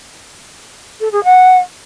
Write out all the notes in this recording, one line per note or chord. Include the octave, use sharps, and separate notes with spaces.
A4
G#4
F#5